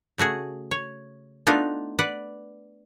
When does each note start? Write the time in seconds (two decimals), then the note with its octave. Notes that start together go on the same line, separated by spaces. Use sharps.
0.18 C#3 A3 F#4 G#4
0.71 C#5
1.47 A3 B3 D4 D#4 F4
1.99 B4 D5 F#5